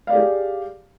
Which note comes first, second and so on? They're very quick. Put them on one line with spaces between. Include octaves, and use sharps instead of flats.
F5 D5 G4 G#4